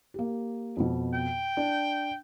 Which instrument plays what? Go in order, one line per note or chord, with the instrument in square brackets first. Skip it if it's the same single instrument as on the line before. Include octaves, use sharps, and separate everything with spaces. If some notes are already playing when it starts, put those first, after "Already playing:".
[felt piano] A#3 G4
F2 B2
[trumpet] G5
[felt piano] D4